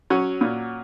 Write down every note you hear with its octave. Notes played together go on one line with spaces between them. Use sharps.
F#3 C#4
A#2